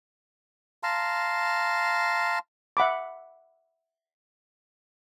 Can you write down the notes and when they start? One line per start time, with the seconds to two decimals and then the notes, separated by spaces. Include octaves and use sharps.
0.83 F5 A5 A#5 C6
2.77 E5 F#5 B5 D6